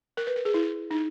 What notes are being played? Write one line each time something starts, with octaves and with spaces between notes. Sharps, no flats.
A#4
B4
A#4
G#4
E4
D#4